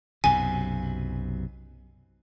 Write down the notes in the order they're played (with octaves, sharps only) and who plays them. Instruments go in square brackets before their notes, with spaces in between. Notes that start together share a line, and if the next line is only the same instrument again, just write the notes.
[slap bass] B1 F#2 C3 [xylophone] G#5